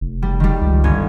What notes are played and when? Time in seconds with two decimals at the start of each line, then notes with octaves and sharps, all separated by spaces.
0.01 F1
0.22 G3
0.40 D#3 G3
0.61 C#2
0.84 G1 G#6